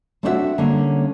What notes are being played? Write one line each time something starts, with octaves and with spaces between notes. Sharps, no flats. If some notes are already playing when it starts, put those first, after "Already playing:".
A3 C4 D4 E4 F#4 E5
D3 G3 A#3 C#4